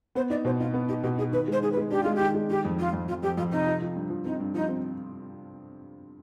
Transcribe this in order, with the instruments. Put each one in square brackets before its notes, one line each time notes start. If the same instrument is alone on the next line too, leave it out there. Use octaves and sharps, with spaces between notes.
[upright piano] B3 [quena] C5
[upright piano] D#4 [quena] D5
[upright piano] B2 [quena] C5
[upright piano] D#4 [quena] F4
[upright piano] B3
[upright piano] D#4 [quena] G4
[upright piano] B2 [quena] G4
[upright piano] D#4 [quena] G#4
[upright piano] D#3 [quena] B4
[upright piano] G#3 [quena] C5
[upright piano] D#3 [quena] G#4
[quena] B4
[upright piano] G#3
[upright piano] D4 [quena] G4
[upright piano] G#3 [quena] F4
[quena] G4
[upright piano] D#3
G#3
[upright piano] D#3 [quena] G4
[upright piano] F2
[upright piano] F2 [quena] F4
[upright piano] F2
[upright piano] F2 [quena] F4
[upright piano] F2 [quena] G4
[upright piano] F2 [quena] F4
[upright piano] C3 [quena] D#4
[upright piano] F3
F3
G2
F3
[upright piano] C4 [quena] D#4
[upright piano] G2
[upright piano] F3 [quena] D#4
[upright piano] C4